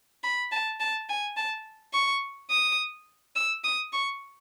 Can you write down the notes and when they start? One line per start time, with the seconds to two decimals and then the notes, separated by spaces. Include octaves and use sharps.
0.24 B5
0.52 A5
0.80 A5
1.09 G#5
1.37 A5
1.94 C#6
2.50 D#6
3.36 E6
3.64 D#6
3.93 C#6